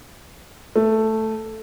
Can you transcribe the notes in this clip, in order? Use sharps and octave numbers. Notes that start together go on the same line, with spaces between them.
A3